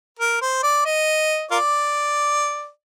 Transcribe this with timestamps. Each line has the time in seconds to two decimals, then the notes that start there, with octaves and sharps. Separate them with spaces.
0.19 A#4
0.41 C5
0.63 D5
0.85 D#5
1.51 F4 A#4 D5